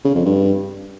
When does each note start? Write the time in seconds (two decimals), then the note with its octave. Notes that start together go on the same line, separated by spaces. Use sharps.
0.05 C#3
0.15 F2
0.26 G2